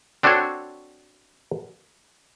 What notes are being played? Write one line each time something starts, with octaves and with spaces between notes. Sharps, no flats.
C4 D4 F#4 A4 C5 C#5